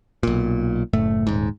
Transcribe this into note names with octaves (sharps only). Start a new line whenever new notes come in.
B1 A#2
F#1 A2 A3
D#1 G#2